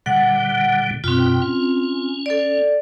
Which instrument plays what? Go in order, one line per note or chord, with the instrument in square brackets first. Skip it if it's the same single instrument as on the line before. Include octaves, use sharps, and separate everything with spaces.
[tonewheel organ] A#2 D3 G3 [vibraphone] F#5
[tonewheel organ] F#2 B2 G5 [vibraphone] C4 F4
[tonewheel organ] C#4
[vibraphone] A4 D5